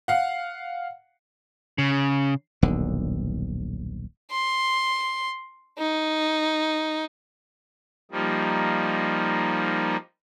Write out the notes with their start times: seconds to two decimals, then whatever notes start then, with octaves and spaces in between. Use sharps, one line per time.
0.08 F5 F#5
1.78 C#3
2.62 D#1 B1 D3
4.31 C6
5.78 D#4
8.11 F3 G3 A#3 D#4